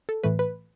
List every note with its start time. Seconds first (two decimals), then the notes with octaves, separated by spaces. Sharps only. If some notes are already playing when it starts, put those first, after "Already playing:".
0.09 A4
0.23 A2 E3 A3 B4
0.39 B4